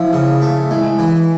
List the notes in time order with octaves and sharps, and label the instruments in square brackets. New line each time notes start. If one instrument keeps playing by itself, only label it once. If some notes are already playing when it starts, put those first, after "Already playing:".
Already playing: [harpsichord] F3 [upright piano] E4
[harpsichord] C#3
A3
[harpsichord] G#3 [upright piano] E4
[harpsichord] E3